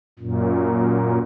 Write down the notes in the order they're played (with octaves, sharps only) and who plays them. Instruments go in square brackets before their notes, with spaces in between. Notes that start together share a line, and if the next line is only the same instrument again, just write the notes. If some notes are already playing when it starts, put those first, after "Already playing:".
[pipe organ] F#2 A#2